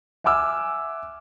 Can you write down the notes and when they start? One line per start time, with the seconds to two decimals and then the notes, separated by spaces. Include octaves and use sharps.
0.24 E5 F#5 G#5 D6 E6 F6